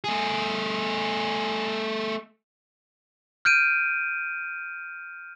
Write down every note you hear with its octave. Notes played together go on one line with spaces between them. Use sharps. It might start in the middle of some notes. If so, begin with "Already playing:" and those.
A3 G#4
F6 G6 D7 D#7